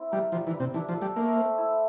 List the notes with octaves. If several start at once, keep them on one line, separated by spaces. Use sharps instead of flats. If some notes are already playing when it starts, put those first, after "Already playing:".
Already playing: C4 E4
G3 A#4
F3 G3
E3
G3
C3
E3 D4
F3
A4
G3
A3 A#3
C5
E4